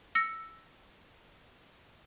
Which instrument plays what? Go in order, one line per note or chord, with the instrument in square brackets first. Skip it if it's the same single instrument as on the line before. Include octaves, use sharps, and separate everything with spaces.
[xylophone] E6 A#6 C#7